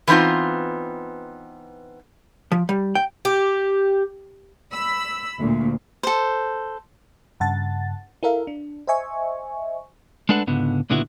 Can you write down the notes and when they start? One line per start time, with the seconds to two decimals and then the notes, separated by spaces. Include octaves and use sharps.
0.07 E3 B3 C4 D#4 F4
2.52 F3
2.69 G3
2.95 G5
3.25 G4
4.71 B5 E6
5.40 D2 A#2
6.03 A4 C5
7.40 G2 C#3 F#5 A5 A6
8.23 E4 A4 A#4 E5 F5
8.47 D4
8.87 C5 D#5 E5 G#5 C#6
10.29 G#3 A3 D4 A4 B4 F#5
10.47 C#2 G#2 D3 B3
10.90 C#2 A#2 D3 B3 E4 F#4